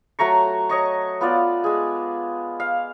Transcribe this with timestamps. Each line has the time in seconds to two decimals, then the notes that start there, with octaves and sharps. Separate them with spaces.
0.19 F#3 A3 A#5 C#6
0.69 C#5 D#5 C#6
1.21 B3 F4 D5
1.64 G#3 G#4
2.60 F5